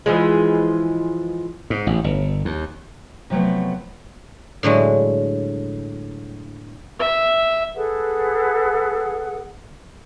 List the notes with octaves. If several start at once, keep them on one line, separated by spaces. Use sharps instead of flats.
E3 F3 G#3
G#2
A1
G1
D#2
C3 F3 F#3 A3 B3
A2 D3 F#3 G#3
E5
G#4 A4 B4 F#5